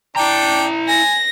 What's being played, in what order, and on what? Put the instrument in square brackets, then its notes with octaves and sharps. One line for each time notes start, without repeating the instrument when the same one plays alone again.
[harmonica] D4 G5 [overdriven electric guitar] E4 A#5
[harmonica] G#5 [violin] A#6